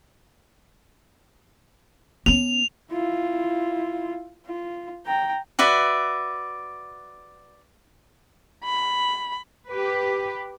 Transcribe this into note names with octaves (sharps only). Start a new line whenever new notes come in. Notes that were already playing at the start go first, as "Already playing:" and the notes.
B3 C#4 F7
E4 F4
F4
G5 A#5
F#4 B4 D5 E5
B5
G4 B4